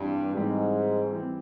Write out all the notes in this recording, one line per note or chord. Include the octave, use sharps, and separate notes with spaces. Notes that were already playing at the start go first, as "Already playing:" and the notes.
Already playing: G2 E3 G3 C4
G#2 E3 G3 C4
E3 G3 C4